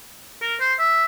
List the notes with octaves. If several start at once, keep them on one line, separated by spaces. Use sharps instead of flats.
A#4
C5
E5